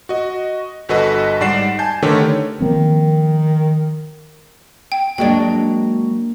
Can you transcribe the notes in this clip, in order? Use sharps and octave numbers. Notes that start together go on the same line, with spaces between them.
F#4 D#5
G1 F#4 A4 B4 D#5
G#2 G3 D5 F#5 C7 E7
G#5 A5 G6
D3 D#3 A3 G4 B4 C#5
D#3 F3 A#3 C4
G5
F#3 G#3 A#3 D4 G5